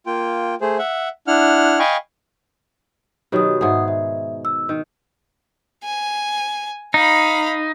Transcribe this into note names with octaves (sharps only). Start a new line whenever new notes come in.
A#3 F4 G5
A3 G#4 C5
E5 F#5
D4 E4 F#5 F6
D#5 F5 G5 G#5 B5 C#6
B2 D#3 F#3 G4 D#6
G#2 G#4 E5 F#5 D#6
E5
E6
D#3
G#5
D#4 F5 B5